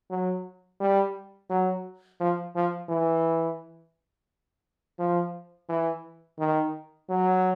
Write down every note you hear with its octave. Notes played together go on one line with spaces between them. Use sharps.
F#3
G3
F#3
F3
F3
E3
F3
E3
D#3
F#3